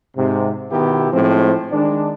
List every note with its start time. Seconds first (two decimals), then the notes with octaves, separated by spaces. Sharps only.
0.17 G#2 C3
0.72 B2 D#3 B3 E4 G4
1.12 A2 F3 G#3 C4
1.71 D#3 G#3 D4